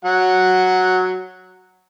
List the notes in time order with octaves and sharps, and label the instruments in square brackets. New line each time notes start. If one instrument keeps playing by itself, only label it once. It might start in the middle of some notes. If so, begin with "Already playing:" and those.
[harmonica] F#3 F#5